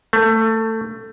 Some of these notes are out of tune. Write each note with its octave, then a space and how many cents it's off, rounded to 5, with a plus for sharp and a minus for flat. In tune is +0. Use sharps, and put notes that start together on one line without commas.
A3 +20